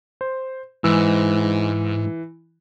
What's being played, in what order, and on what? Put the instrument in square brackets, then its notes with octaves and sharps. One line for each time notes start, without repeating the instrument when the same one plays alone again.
[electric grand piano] C5
[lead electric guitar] G#2 [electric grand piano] E3 E6